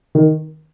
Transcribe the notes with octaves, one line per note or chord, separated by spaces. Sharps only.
D#3